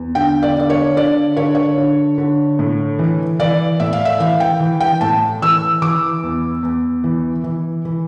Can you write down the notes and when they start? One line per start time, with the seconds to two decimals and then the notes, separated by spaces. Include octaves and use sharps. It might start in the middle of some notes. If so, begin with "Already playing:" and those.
Already playing: E2
0.15 D3 G5
0.43 D5
0.57 D3 D5
0.70 C#5
0.97 D3 D5
1.37 D3 C#5
1.55 C#5
1.78 D3
2.18 D3
2.59 A2
2.99 E3
3.40 E3 D5
3.80 A2 E5
3.93 F5
4.05 E5
4.20 E3 F5
4.40 G5
4.60 E3
4.80 G5
5.01 A2 A5
5.42 E3 E6
5.82 E3 D6
6.23 E2
6.63 E2
7.04 E3
7.44 E3
7.85 E3